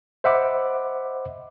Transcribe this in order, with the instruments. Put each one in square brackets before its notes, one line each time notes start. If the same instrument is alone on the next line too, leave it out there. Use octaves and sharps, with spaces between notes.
[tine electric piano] C5 D#5 E5 F#5 B5 D6